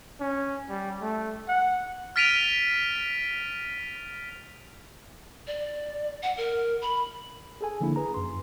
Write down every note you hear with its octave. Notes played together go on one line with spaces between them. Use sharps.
C#4
G3
A3
F#5
F6 A6 B6 D7 D#7 F7
D5
F#5
A#4
B5
G#4 A4 G#5
D3 F3 A#3 D4 E4
G#4 B4 A#5
F#2 C6